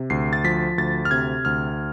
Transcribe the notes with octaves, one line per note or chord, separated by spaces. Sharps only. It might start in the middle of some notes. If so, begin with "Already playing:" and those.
Already playing: C3
D2 C7
A6
F3 B6
D2 A6
F6
C3 G#6
D2 F6